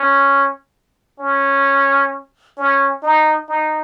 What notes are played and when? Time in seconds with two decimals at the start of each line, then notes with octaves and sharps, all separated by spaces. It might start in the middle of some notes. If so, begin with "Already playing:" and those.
Already playing: C#4
1.20 C#4
2.57 C#4
3.03 D#4
3.49 D#4